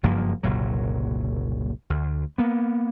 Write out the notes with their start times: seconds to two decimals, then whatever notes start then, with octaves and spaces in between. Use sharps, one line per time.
0.03 F#1 G2 F3 A#3
0.43 F#1 C2 A#2 F#3
1.90 D2
2.38 A#3 B3